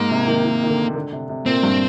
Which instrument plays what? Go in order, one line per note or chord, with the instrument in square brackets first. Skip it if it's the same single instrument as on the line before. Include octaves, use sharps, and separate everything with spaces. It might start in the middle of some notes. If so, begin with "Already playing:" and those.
Already playing: [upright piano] G#2 [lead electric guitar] A#3
[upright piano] C3
D#3
D#3
D#3
D3
D3
C3
C3
[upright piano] A#2 [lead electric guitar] C4
[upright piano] G2